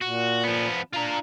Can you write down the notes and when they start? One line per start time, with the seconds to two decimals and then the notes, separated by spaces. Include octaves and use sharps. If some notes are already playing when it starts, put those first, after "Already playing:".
0.01 A#2 F#4
0.44 F3 B3
0.93 D4 F4 A#5